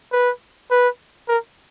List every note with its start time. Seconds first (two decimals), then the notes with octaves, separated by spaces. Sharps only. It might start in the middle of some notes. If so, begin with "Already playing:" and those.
0.12 B4
0.71 B4
1.28 A#4